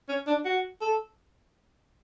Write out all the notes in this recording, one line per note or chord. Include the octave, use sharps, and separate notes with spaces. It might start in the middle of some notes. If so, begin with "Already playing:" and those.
C#4
D4
F#4
A4